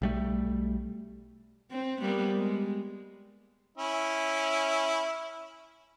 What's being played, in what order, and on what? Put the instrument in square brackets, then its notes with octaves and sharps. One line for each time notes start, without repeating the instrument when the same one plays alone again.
[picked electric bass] B1 G3 A3
[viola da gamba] C4
G3 A#3 B3
G#3
[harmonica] C#4 E4